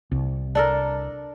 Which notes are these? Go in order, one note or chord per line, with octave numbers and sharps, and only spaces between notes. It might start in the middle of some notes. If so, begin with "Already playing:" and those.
C2
D4 A4 A#4